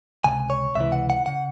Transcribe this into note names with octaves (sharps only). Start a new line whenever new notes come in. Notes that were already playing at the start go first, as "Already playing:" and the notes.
C#2 C3 G#5
C#5
C#2 C3 E3 E5
F#5
F#5
C#3 F#5